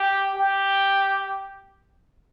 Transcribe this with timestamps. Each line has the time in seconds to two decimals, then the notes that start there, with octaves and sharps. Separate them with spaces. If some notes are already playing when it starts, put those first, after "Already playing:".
Already playing: G4
0.35 G4